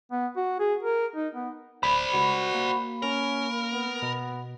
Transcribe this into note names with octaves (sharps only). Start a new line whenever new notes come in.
B3
F#4
G#4
A#4
D#4
B3
D1 C5 D5 B5
C#2 F#4
A#3
C#4 A#4
B3
B2